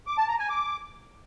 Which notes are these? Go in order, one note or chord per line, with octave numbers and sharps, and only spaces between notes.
D6
A5
A#5
G#5
D6